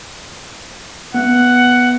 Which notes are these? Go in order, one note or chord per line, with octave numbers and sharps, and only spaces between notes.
B3 F#5